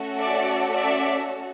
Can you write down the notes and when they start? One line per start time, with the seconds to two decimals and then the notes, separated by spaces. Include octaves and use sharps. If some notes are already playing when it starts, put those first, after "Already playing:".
Already playing: A3 C#4 F#4 A4
0.20 D5 E5
0.73 D5 E5